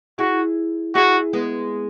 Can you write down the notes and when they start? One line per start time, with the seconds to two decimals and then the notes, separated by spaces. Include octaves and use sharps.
0.19 E4 F#4 G#4
0.95 E4 F#4 G#4
1.33 G#3 B3